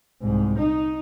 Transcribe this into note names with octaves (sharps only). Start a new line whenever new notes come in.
C2 G#2
D#4